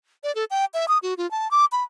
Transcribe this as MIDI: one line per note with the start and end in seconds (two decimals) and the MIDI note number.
0.24 0.34 74
0.35 0.45 69
0.51 0.65 79
0.74 0.86 76
0.88 0.98 87
1.03 1.14 66
1.18 1.29 65
1.31 1.50 81
1.51 1.65 86
1.72 1.83 83